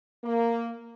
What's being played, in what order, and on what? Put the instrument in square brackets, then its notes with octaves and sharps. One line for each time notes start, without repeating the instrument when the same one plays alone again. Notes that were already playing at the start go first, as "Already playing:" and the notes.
[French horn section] A#3